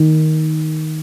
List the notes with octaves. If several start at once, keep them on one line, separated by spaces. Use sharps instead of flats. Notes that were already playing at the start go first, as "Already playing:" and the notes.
Already playing: D#3